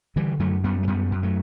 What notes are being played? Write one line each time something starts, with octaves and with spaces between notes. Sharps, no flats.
D3 E3 G3
F#2 F#3 A3
F#2 G3 B3
A3
F#2 G3 B3
F#2
F#3 A3